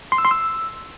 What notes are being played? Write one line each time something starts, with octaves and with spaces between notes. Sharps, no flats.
C6
E6
C6
E6